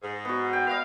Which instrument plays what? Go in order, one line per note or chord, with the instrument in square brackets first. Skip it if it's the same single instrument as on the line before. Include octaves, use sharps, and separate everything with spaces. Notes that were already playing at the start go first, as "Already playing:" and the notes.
[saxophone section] G#2
[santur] B3 F#4
G5
[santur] B4 D#5 [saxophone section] F5